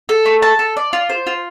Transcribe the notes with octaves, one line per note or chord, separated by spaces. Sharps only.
A4
A3
A5
A4
D5
F4
C5
F4